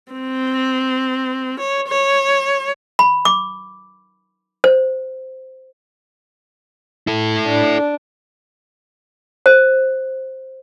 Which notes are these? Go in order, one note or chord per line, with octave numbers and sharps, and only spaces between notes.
C4
C#5
C#5
B5
D6
C5
E4 A4
D4
C5